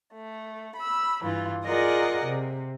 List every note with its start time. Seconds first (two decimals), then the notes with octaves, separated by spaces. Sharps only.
0.14 A3
0.77 B5 E6
1.22 G2 E3 F4
1.65 F4 G#4 A#4 D5 D#5 F#5
2.24 C3